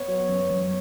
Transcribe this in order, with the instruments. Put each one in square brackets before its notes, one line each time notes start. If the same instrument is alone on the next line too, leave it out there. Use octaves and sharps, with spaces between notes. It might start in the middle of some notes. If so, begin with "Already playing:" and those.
Already playing: [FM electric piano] B3 [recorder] C#5
[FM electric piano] F#3
F#2
F#2